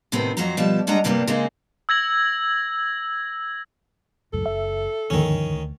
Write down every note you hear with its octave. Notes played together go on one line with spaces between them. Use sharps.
A2 C3 D#3 B3 C4
F2 F#3 F#4 C5 A#5
B2 F3 G3 A5
G3 G#3 D4 D#5 F#5 A#5
G2 C3 G3 A#3 C#4 D4
C#3 G#3 A#3 C4 D#4
E6 G#6 A#6 F#7
C#2 F#2 A2 A4
F#1 E5
D#2 G#2 D3 D#3 F3 C#4
D2